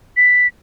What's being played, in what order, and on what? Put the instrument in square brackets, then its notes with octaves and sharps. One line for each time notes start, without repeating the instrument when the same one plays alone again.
[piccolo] B6